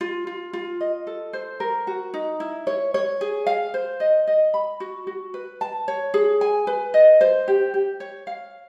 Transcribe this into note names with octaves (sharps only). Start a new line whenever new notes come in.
F4
F4
F4
D#5
A4
C5
A#4
F#4
D#4
E4
C#5
C#5
G#4
F5
C5
D#5
D#5
B5
F#4
F#4
B4
A5
C#5
G#4
G#5
B4
D#5
C5
G4
G4
C#5
F5